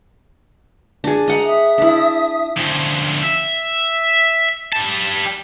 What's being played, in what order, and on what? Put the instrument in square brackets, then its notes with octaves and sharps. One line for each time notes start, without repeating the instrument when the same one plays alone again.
[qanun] D4 G#4
D#5 F#5 A#5
[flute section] E5 D#6
[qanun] D4 E4
[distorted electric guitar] D2 F3
E5
G3 A5